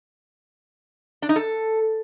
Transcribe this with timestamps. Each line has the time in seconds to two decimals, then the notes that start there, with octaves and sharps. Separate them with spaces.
1.22 D4
1.29 D#4
1.36 A4